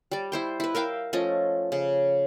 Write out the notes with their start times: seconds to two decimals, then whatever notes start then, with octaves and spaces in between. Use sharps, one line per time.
0.11 G3 D5
0.32 E4 C5 G5
0.60 E4 B4
0.75 A#4 E5 F5 G5
1.13 F3 A3 C#4 D#5
1.72 C#3